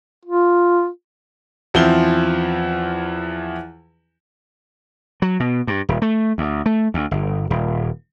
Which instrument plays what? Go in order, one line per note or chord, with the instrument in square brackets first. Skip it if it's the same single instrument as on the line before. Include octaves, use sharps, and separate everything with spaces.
[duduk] F4
[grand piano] E2 F3 C4 E4 G7
[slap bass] F#3
B2
G2
D#1
A3
D2
A3
D2
G1
D#1